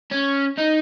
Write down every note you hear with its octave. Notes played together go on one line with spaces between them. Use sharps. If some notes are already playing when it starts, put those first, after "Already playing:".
C#4
D#4